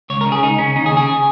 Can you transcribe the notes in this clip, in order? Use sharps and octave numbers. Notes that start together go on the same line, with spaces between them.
C#2 C#5
A#4
C#3
G#4
C#2 D#4
C#3 C#4
D#2 D#4
G#4
C#3
G#4